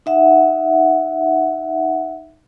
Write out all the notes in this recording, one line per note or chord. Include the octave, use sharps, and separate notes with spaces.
D#4 E5 F#5